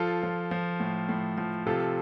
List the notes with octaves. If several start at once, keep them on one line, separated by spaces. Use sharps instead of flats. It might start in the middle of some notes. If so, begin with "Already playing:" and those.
Already playing: F3 F4 A4
F3
F3
A2
A2
F3
C3 F4 A4